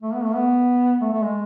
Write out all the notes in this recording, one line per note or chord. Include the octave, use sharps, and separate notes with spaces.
A3
B3
A3
B3
A3
A3
G#3